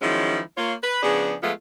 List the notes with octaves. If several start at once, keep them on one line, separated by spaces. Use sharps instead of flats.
D#3 F3 F#3 G#3 C#4 E4
A#3 F4 C#5
B4
C#3 F3 B3 D4 G#4
F3 G#3 A3 B3 F4